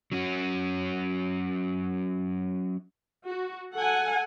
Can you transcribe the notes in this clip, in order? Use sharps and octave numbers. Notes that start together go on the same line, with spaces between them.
F#3 C#4 F#4
F#4
A4 F#5 G#5